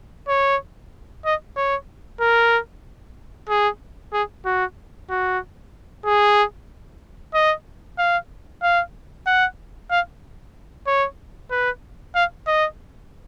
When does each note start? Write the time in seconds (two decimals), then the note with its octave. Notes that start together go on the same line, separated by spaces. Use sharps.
0.28 C#5
1.25 D#5
1.57 C#5
2.21 A#4
3.49 G#4
4.13 G#4
4.46 F#4
5.10 F#4
6.06 G#4
7.34 D#5
7.98 F5
8.63 F5
9.27 F#5
9.91 F5
10.87 C#5
11.51 B4
12.15 F5
12.47 D#5